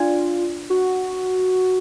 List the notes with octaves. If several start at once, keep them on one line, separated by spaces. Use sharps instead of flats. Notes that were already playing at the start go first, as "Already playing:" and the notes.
Already playing: D4 F4 D5
F#4